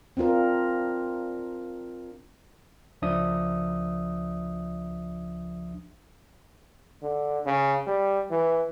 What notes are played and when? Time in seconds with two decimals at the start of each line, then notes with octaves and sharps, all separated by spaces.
0.17 C4 D4 F4 A#4
3.02 C#2 F3 D4 E5 D#6
7.02 D3
7.46 C#3
7.87 G3
8.31 E3